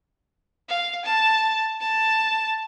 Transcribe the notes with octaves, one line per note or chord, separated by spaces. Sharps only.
F5
A5
A5